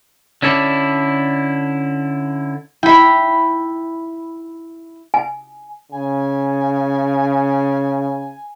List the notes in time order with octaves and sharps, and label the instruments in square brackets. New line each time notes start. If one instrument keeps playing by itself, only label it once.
[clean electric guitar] D3 C#4 E4 A4 D5
[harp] E4 [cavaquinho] G5 B5
[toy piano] G#5
[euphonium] C#3 [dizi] G#5